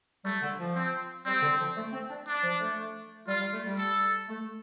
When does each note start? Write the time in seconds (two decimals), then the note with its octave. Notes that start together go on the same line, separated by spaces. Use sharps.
0.25 G3 A3
0.42 D3
0.59 F3
0.75 C4
1.26 G3 C4
1.42 D3
1.60 F3
1.77 A3
1.93 C4
2.10 D4
2.27 D4
2.43 F3
2.60 A3
3.27 G3 F4
3.40 G3
3.53 A3
3.65 G3
3.78 A4
4.28 A3